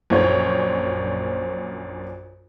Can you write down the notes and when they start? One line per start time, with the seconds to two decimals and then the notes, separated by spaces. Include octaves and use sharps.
0.10 A#1 F#2 A#2 D4 C5 C#5